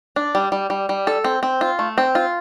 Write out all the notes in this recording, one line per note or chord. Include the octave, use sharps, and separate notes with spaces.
D4
G3
G3
G3
G3
A4
C4
C4
F4
A3
C4
F4